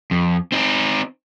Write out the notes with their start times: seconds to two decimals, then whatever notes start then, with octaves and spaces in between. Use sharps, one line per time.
0.11 F2
0.52 C4 D#4